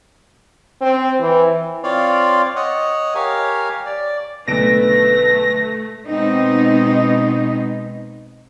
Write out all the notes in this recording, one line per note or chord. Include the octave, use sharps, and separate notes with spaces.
C4
E3
C4 F4 C#5 D5 F5
C#5 D#5 F#5
G4 A#4 C#5 F5 G#5
D5
B1 D3 A3 B4 A#6 D7
B2 G#3 B3 C4 D#4